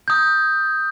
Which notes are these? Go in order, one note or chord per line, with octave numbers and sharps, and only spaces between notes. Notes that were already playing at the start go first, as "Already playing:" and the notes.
D#6 G6